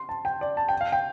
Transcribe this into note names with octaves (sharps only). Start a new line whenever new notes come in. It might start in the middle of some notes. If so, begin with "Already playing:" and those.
Already playing: C6
A5
G5
D5
A5
G5
F5
G5